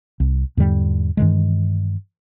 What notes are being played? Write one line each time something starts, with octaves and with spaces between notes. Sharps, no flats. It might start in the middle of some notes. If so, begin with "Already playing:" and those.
C2
E2 G#2 D3 G3
G2 D#3 E3 G#3